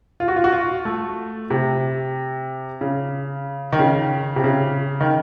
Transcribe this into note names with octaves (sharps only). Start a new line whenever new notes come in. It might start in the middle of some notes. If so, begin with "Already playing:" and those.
F4
F#4
F4
F#4
F4
A3
C3
C#3
D#3
C#3
C3
C#3
D#3